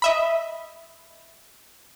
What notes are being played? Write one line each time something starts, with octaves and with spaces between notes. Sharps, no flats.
D#5 E5 B5